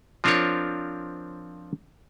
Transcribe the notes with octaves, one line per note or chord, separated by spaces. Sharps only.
F3 C4 D4 F4 A#4 C#5